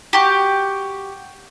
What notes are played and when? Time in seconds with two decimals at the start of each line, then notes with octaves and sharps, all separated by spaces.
0.13 F#4 G4